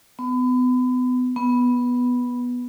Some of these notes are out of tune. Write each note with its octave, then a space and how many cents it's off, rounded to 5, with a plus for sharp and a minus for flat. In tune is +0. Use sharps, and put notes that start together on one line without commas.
B3 +30
B3 -5